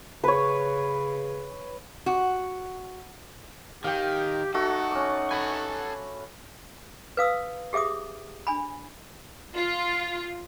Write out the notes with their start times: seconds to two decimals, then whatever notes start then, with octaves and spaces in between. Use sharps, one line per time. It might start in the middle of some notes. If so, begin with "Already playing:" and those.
0.24 C#3 B4 C#5
2.06 F#4
3.84 D#3 G4 F5 G5
4.55 A3 D#4 F#4 A4 F#5
4.91 C#4 D6
5.31 A4 G#5 B5
7.17 B4 F5 D#6 E6
7.73 G4 G#4 E5 D6 D#6
8.47 D4 G#5 B5
9.56 F4